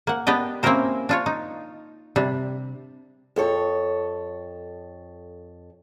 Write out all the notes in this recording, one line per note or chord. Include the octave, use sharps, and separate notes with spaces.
A#3 F#5
B3 D4 G4 D#5
A#3 C4 C#4 E4 A#4 C5
D4 F4 C#5
D#4
C3 G3 D4
F2 A4 C#5